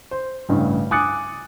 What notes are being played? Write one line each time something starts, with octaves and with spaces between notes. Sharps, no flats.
C5
A1 G2 C#3
G#5 D6 D#6 F#6 A6 C#7